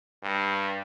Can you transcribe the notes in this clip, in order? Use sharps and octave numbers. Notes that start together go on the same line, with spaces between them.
G2